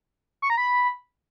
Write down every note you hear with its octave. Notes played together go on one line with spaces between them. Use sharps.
C#6
A#5
B5